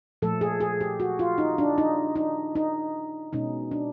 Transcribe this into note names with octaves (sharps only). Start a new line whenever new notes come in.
A#2 F3 A3 A4
G#4
G#4
G4
F#4
F4
D#4
D4
D#4
D#4
D#4
B2 G#3 C#4 D#4
D4